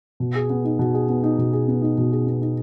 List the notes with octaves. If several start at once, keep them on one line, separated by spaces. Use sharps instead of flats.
B2
G#4
B3
D#4
B2
G#4
B3
D#4
B2
G#4
B3
D#4
B2
G#4
B3
D#4